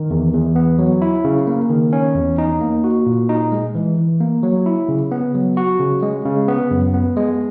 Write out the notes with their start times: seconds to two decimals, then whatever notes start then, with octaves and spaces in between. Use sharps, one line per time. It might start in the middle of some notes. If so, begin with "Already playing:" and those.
Already playing: D#3
0.10 E2
0.33 E2
0.56 B3
0.79 F#3
1.02 E4
1.24 C#3
1.47 A#3
1.70 D#3
1.93 C#4
2.15 E2
2.38 D#4
2.61 A#3
2.84 F#4
3.06 A#2
3.29 D#4
3.52 G#3
3.75 E3
3.98 E3
4.20 A#3
4.43 F#3
4.66 E4
4.89 C#3
5.11 B3
5.34 F#3
5.57 F#4
5.80 C#3
6.02 G#3
6.25 C#3
6.48 B3
6.71 F#2
6.94 B3
7.17 G#3